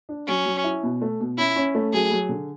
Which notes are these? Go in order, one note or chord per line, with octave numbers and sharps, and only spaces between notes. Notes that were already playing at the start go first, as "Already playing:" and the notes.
D4
F#3 C#4
F#3
E4
B2
A3
B2
C#4 E4
C#4
A3
F#3 G#4
F#3
D3